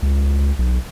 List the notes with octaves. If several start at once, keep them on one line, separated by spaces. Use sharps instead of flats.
C#2
B1